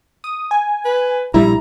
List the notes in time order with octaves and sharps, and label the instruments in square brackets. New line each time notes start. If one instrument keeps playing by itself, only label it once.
[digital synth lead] D#6
G#5
[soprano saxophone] B4
[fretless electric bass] A#1 G3 [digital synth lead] E4 [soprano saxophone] A#5